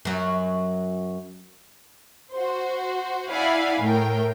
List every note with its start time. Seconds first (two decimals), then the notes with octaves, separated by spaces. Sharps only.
0.05 F#2 F#3
2.32 F#4 C5
3.30 E4 D5 F5 F#5 G#5 B5
3.81 A2 A#4 G5